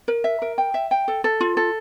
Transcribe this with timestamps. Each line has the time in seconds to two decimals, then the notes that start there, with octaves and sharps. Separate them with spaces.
0.08 A#4
0.24 E5
0.42 A#4
0.58 G5
0.74 E5
0.91 G5
1.08 A4
1.24 A4
1.41 F4
1.57 A4